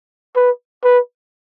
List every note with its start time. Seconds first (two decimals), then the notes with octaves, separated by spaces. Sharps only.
0.36 B4
0.84 B4